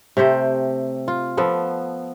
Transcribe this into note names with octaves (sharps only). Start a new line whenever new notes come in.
C3 A3 G4 C5
F4
F3 B3 A4